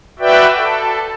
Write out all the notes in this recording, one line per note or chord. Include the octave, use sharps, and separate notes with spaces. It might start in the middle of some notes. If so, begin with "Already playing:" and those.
F#4 B4 D5 E5 G5
A4